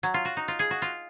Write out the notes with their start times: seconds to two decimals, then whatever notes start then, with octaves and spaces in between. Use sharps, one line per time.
0.03 F#3
0.14 F4
0.25 F#4
0.37 D#4
0.48 F4
0.59 G#4
0.71 F#4
0.82 F4